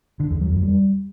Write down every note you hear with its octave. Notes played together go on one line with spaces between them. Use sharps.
D3
E2
F#3
F2
G3